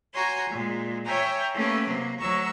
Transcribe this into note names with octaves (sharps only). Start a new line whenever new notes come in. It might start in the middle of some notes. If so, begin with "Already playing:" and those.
F#4 C#5 G#5 A#5 C6
A#2 G#3
C#5 E5 G5 G#5 A#5
A3 A#3 C#4 G4 B4
C3 F#3 A#3
D2 F#3 A#5 C#6 E6